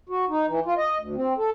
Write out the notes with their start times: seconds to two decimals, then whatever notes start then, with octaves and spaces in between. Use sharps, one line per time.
0.09 F#4
0.29 D#4
0.47 E3
0.66 F4
0.77 D#5
0.99 D2
1.16 C4
1.38 A4